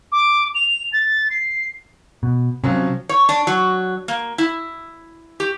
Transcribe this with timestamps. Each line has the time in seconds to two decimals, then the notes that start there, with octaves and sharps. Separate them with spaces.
0.12 D6
0.55 F7
0.93 A6
1.30 C7
2.23 B2
2.64 C3 F3 F#3 C#4
3.09 C#5
3.29 D4
3.47 F#3
4.08 A#3
4.38 E4
5.40 G4